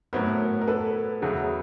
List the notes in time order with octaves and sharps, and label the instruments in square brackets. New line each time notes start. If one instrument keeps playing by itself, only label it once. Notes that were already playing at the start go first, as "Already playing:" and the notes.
[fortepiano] A2 F#3 B3 [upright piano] A#4 C5
[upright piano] A#4
A4 B4
[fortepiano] E2 C#3 F#3